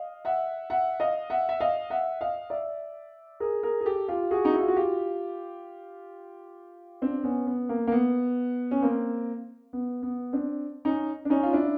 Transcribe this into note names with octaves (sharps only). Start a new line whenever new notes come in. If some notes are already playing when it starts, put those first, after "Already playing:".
Already playing: D#5 F5
E5 F#5
E5 F#5
D#5 F5
E5 F#5
E5
D#5 F5
E5 F#5
D#5 F5
D5 E5
G#4 A#4
G#4 A#4
G#4
G4 A4
F4 G4
F#4 G#4
D#4
E4
F4
F#4
F4 G4
C4 D4
B3 C#4
B3
A#3
A#3
B3
C#4
A#3 C4
B3
B3
C4 D4
C#4 D#4
D4
C#4 D#4
F4
D4 E4